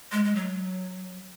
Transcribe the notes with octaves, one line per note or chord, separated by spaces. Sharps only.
G#3
G#3
F#3